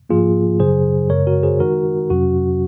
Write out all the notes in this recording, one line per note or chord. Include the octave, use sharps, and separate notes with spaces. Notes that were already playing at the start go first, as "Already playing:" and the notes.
G#2 F3 A#3 F4 G#4
F#2 C#3 F#3 G#4 C5
F#2 C#3 G#3 A#4 C#5
F#4 A#4
G#4 C5
D#3 G#3 D#4 F#4 A#4
F2 C3 F#3 C#4 F#4